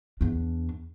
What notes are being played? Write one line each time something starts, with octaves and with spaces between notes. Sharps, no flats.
E2 D4